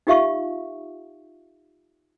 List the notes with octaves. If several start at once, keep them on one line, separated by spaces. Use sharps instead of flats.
D#4 F4 G4 E5 F5 C#6